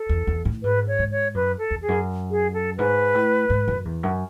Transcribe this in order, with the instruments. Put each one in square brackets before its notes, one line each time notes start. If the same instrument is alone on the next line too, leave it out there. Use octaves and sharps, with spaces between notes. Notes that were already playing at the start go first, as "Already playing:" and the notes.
Already playing: [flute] A4
[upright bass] E2
E2
A2
[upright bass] G#2 [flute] B4
[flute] C#5
[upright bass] G#2
[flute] C#5
[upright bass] F#2 [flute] B4
[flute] A4
[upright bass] E2
[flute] G#4
[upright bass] F#2
[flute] G#4
A4
[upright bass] G#2 [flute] B4
[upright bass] A2
G#2
F#2
E2
F#2